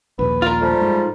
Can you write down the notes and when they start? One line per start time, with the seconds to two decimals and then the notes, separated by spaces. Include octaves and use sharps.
0.19 A#1 D#2 B4
0.42 F4 A#4
0.61 F3 G3 A3
0.81 G#2